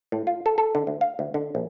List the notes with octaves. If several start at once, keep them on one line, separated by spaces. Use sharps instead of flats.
A2
F4
A4
A4
D3
D2
F5
D2
D3
A#1